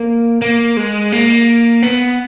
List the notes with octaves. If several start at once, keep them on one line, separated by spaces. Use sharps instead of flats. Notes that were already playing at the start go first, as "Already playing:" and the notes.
Already playing: A#3
A#3
G#3
A#3
B3